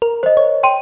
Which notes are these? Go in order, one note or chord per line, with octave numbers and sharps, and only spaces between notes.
A#4
C5 D#5
C#5
G5 C6 D#7